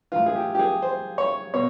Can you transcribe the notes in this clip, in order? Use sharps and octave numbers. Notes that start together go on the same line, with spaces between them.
A2 E3 F4
G#4
G4
G4
G#4
C5
C#5
B2 C#5